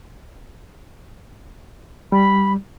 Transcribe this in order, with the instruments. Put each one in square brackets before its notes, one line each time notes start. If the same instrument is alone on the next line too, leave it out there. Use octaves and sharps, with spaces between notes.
[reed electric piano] G3 [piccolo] B5